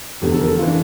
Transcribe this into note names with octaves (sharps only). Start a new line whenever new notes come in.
F1 E2 D3 G4
A4
A#4
A4
F4
E3
D4